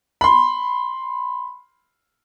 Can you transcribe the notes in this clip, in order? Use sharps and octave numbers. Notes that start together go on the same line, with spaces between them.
B5 C6